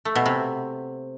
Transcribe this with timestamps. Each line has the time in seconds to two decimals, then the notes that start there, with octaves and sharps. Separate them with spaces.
0.05 A3
0.15 B2
0.26 C3